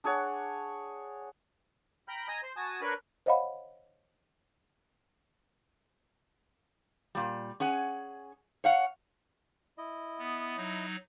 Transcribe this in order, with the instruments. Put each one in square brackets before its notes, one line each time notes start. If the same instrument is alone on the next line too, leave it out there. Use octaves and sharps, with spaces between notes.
[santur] D4 G#4 C#5 F#5
[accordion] G5 A#5 B5 F6 G6
D#5 G#5 A#5 D#6
C5 G6
F#4 G#5 A5 D#6
D4 A#4 B4 C#5 B5
[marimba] C5 C#5 D#5 F5 F#5 B5
[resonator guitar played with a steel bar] A#2 G3
C#4 G#4 F#5
C#5 F5 F#5
[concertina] E4 D#5
[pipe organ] B3
F#3 D#4